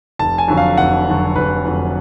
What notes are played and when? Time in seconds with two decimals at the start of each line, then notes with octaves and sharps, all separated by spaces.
0.19 F1 A5
0.38 G#5
0.48 F2 D3 F#3
0.57 F5
0.77 F1 F#5
1.07 F2 D3 F#3
1.36 F1 B4
1.65 F2 D3 F#3